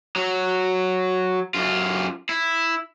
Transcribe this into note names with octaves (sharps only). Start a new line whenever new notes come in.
F#3
F#2 F4
E4